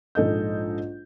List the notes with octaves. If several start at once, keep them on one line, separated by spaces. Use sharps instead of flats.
A#1 G#2 A4 D#5 G6